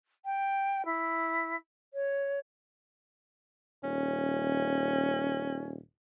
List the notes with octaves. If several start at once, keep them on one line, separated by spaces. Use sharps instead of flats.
G5
E4
C#5
D#1 C#4